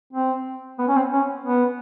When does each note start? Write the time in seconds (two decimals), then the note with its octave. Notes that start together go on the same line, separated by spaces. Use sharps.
0.13 C4
0.79 B3
0.88 C#4
0.96 C4
1.12 C#4
1.45 B3